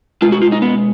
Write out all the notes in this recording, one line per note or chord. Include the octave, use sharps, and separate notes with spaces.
B2 G#3 F4
F#4
F4
D#4
B3